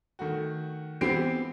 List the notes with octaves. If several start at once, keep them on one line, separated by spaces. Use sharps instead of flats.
D#3 A3 F#4
E3 B3 C4 G4 C7 D7